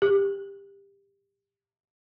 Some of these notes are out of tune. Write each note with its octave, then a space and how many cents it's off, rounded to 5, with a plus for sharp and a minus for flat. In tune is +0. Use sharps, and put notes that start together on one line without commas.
G4 +20